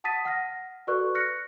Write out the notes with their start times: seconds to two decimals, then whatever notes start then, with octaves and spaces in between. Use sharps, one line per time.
0.04 F#5 A5 D#6 A6 B6 D#7
0.25 F#5 F6 A#6
0.87 F#4 A4 B4 D5 C#6 F#6
1.15 F6 F#6 A#6 C#7